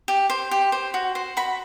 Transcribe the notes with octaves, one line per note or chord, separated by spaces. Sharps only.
G4
C5
G4
C5
F#4
C5
F#4 B5